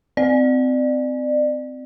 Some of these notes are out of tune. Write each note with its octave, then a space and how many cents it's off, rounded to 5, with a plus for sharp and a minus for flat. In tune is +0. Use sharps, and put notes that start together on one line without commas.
C4 -25 D5 +25